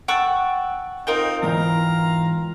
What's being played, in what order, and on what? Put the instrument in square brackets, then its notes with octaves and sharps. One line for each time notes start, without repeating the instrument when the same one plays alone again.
[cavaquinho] F#5 A5 [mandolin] G5 C#6 E6
[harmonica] C4 D#4 [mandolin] F4 A#4 G5
[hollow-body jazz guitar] E2 G#2 E3 [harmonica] F5 A#5